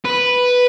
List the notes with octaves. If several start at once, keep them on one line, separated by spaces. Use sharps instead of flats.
B4